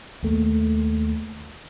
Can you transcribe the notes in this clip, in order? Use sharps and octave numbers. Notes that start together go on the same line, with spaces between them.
D#2 A3 A#3